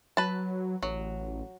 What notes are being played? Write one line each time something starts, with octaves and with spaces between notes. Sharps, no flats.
F#3 B4 A5
A1 F#3